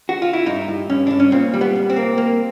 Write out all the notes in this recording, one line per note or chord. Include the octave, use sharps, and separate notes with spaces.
F#4
F4
E4
G2 D#4
G2
G2 C#4
G2 D4
C#4
A#2 C4
G3
B3
C2
C4
A#3
A#3